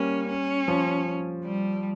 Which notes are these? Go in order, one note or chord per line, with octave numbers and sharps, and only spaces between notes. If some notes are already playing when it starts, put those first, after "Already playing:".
Already playing: G3 A#3 C#4
C#4
F3
G3